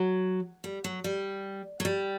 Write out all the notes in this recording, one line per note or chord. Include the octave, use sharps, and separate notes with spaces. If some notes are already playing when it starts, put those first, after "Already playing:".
Already playing: F#3
G3
F#3
G3
F#3
G3